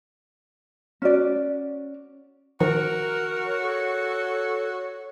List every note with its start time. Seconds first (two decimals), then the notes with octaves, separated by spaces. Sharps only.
1.02 C#4 F#4 D5
2.60 D#3 F3 D#4 F#4 A#4
3.46 C#5
3.62 A4